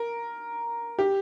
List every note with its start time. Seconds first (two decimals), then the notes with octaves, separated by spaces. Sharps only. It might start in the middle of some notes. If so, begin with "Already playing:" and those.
Already playing: A#4
0.99 G4